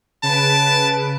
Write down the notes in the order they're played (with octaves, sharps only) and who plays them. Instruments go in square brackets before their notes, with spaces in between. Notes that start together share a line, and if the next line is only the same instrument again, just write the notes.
[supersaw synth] C#3 B4 D7 [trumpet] A5